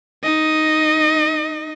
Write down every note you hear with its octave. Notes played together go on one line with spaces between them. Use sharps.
D#4 D#5